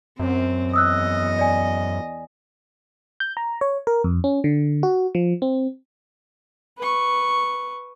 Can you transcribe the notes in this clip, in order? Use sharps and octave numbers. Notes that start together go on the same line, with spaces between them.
F#2 C4
E2 D#5 D#6 E6 F#6
D5 G#5
G6
A#5
C#5
A#4
F2
C#4
D3
F#4
F3
C4
B4 C#6